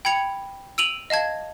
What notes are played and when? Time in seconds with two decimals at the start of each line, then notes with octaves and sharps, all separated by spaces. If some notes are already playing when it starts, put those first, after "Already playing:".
0.05 G5 B5 G#6 C#7 F7
0.78 E6 D7 D#7 F7 F#7
1.10 D#5 F5 A5 G#6